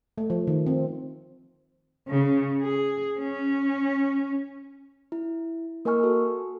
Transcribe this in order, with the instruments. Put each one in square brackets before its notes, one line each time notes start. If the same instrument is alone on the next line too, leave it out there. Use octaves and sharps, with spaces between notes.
[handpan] A3
F3
D#3
C4
[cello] C#3
G#4
C#4
[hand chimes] E4
A#3 A#4 D#5 G#5 C#6 F6
F#4 A4